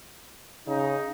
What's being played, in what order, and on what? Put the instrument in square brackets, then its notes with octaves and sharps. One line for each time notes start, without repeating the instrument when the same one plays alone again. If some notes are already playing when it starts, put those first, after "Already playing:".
[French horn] C#3 [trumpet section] D#4